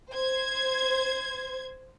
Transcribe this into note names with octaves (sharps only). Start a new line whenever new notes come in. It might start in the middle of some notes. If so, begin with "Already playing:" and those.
C5 G#6